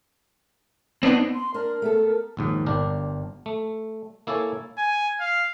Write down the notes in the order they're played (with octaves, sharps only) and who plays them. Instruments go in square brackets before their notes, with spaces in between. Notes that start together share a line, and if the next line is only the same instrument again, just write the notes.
[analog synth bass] B3 [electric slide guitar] C4 D4 D#4
[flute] C6
[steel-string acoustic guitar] A#3 D4 [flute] A#4
[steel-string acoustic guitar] A3 B3 A4
[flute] A#4
[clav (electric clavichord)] A#1 D#2 G#2
G1 D4 G4 A#4
A3
A#3 E4 A4 C#5 G#5
[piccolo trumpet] G#5
F5